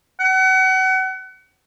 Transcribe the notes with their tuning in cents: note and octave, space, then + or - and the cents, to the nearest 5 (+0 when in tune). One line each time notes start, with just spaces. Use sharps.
F#5 +35